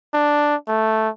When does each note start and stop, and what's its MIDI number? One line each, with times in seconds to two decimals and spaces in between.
0.14 0.56 62
0.68 1.09 57